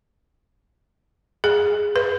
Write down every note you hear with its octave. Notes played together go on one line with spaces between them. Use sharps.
G#4
B4